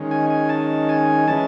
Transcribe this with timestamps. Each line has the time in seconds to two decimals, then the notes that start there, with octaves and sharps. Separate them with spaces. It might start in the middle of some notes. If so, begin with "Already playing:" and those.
Already playing: D#3 G#3 C#4
0.11 G#5
0.30 G#5
0.49 A5
0.89 G#5
1.28 E3 G#3 C#4 A5